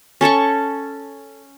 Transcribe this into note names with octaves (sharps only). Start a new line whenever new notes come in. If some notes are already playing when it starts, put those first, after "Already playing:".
C#4 A4 A5 C#6